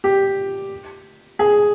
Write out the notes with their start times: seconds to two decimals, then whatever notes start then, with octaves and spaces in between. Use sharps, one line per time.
0.04 G4
1.39 G#4